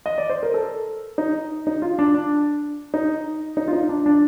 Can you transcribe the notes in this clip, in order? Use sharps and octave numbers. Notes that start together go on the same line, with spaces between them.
D#5
D5
C5
A#4
A4
D#4
D#4
F4
D4
D4
D#4
D#4
F4
D#4
D4
D4